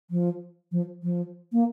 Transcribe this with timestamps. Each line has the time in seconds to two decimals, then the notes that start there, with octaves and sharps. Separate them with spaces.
0.11 F3
0.72 F3
1.03 F3
1.52 A#3